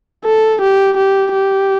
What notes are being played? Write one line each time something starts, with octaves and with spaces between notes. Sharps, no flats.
A4
G4
G4
G4